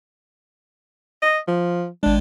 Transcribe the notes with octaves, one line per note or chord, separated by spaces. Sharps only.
D#5
F3
G#1 G#3 D4